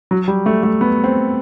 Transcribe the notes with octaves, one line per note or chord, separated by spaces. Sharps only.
F#3
G3
A3
A3
B3
C4